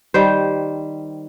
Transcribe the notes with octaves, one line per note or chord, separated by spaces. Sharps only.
D#3 G3 C5